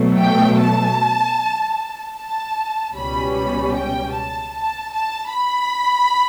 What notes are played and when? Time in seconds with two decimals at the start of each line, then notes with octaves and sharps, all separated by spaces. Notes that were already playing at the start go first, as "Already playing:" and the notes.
Already playing: B2 F#3 A3
0.18 G5
0.59 A5
2.16 A5
2.95 C#2 B2 G3 C#4 B5
3.34 B5
3.75 G5
4.14 A5
4.54 A5
4.93 A5
5.32 B5